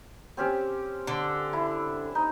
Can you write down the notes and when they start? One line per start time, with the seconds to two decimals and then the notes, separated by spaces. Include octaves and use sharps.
0.37 C4 C#4 G4
1.07 D3
1.53 E4
2.15 D#4